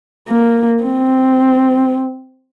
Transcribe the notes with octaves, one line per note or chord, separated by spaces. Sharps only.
A#3
C4